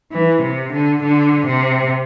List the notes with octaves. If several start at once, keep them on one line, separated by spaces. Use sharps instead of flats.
E3
C3
D3
D3
C3